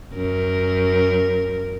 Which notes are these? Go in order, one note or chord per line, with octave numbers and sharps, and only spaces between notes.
F#2 A#4